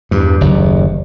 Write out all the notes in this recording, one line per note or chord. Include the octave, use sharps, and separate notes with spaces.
E2 G2
F#1 D#2